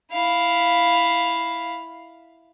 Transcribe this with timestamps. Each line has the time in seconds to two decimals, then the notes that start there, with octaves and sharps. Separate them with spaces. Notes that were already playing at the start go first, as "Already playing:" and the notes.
0.11 E4 F5